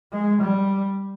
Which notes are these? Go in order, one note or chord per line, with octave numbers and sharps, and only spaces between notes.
G#3
G3